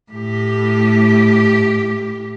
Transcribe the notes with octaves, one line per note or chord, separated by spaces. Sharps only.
A2 G4